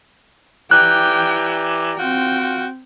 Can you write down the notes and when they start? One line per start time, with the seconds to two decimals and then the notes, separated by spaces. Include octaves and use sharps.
0.71 E3 G4 D5 G5 A#5 F#6
1.99 C4 F4 F#4 G5